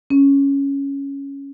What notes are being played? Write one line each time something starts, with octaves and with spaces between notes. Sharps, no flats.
C#4